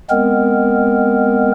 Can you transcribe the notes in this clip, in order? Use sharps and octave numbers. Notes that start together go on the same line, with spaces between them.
G#3 B3 C4 A#4